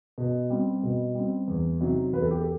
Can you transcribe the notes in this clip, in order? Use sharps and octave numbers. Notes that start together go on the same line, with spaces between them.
B2
G3 C4
B2
G3 C4
E2
C3 F#3 C4 D#4
E2 B4
A4
G4
A4